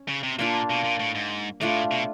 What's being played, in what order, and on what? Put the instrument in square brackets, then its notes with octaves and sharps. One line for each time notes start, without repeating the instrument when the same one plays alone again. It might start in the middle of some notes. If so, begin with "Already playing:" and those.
Already playing: [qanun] C#4
[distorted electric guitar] C#3
C3
[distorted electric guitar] A#2 [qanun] A#3 D4 F4
[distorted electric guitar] B2
A#2
A2
G#2
[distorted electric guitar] A2 [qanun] A3 D4 F4
[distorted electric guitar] B2